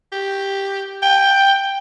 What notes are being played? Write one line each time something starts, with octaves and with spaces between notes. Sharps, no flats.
G4
G5